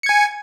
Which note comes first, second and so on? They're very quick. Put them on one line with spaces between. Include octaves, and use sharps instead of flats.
C#7 G#6 G#5